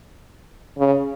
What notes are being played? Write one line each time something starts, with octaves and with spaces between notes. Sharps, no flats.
C#3